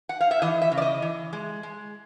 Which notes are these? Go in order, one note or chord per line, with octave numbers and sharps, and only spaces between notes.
F#5
F5
E5
E3 D#5
E5
C#3
D5
D#5
E3
G#3
G#3